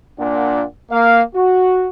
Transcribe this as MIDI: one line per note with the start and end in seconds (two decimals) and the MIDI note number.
0.19 0.64 46
0.19 0.64 62
0.19 0.64 78
0.91 1.22 58
0.91 1.22 77
1.35 1.88 66